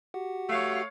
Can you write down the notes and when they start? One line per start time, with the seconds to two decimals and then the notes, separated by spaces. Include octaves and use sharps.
0.14 F#4 G4 F#5
0.49 A3 C#5 F5